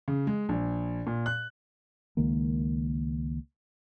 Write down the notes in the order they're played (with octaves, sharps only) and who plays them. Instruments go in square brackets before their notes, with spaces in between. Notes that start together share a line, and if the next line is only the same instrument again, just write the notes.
[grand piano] C#3
G#3
A#1
A#2
F#6
[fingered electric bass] C#2 D#3 G#3 A#3